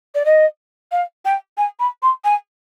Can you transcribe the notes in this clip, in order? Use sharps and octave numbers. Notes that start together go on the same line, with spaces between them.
D5
D#5
F5
G5
G#5
B5
C6
G#5